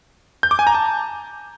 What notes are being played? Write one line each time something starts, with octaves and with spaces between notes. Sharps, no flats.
G6
D6
G#5
A#5
A5